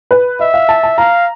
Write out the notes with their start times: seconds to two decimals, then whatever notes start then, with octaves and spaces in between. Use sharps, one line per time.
0.11 B4
0.39 D#5 E5
0.54 F5
0.69 A5
0.83 A5
0.98 F5 A#5